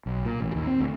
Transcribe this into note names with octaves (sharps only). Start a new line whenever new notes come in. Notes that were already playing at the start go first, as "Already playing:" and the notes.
B1
A#2
A1
D#2
C4
D2